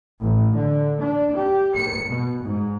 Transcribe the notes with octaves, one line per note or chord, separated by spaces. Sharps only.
A1
D3
D4
G4
C#7
B2
G#2